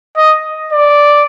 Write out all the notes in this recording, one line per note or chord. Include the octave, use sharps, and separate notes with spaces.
D#5
D5